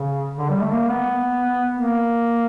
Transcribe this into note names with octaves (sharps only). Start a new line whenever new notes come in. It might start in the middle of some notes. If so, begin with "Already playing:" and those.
Already playing: C#3
D3
G3
A3
A#3
B3
A#3